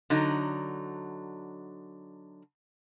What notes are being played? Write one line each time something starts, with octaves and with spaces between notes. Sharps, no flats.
D3 F#3 D#4